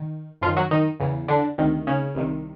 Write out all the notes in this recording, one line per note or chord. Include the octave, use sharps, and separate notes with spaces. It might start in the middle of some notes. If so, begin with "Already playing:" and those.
Already playing: D#3
F#2 F3 F4
D#3
F#3 F#4
D#3 D#4
E2 C#3 E3
D3 D4
D2 C3 D#3
C#3 C#4
C2 C3 D#3